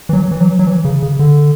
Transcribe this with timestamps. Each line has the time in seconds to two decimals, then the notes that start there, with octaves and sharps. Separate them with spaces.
0.09 E3
0.13 F#3
0.31 E3
0.41 F#3
0.59 F#3
0.67 E3
0.85 C#3
1.02 C#3
1.19 D3